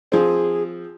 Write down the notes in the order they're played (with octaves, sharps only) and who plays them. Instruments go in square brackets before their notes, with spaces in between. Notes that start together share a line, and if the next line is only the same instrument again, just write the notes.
[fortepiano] F3 C4 [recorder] G#4